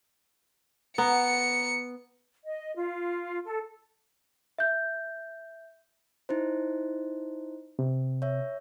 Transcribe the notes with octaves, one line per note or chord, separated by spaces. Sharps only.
B3 A#5 C#7
D#5
F4
A4
E5 G6
D#4 E4 C5
C3
C#5 E5